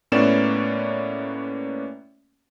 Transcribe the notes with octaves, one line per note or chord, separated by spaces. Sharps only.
A2 A#3 B3 C#4 D5 E7